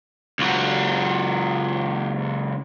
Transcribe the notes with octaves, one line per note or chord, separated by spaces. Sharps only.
C#2 F#3